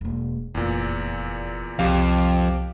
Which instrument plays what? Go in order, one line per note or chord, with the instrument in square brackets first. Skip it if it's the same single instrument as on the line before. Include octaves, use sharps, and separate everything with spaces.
[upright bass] E1 A#3
[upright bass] F1 [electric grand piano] E2 A#2
[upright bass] C2 [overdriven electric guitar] F2 [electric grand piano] G4 F5